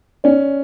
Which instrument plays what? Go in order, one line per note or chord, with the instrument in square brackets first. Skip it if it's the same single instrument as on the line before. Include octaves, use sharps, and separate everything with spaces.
[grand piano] C#4 [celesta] D5